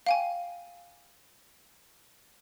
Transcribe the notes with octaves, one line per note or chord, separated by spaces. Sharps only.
F5 G5 G#5